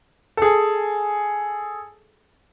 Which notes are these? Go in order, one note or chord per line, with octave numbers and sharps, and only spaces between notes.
G#4 A4